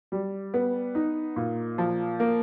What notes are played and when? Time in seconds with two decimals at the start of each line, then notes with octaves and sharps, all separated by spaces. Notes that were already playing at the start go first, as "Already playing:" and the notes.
0.12 G3
0.54 B3
0.95 D#4
1.36 A#2
1.78 F3
2.20 A#3